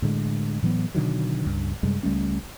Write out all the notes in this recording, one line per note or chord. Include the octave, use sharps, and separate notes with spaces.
A2 D3 G#3
A2 E3 F#3 B3
B2 D3 D#3 F#3
C#2 G2
F#2 C3 G3 G#3
C#2 G3 A3 C#4